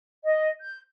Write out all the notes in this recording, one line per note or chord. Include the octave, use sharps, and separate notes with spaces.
D#5
G6